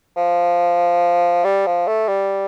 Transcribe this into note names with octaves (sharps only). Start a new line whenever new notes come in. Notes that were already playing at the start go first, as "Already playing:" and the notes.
F3
G3
F3
A3
G3